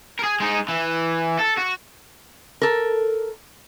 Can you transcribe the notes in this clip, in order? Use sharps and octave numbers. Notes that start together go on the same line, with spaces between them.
G#4 A#4
G#3 D#4
E3
A4
F#4
A4 A#4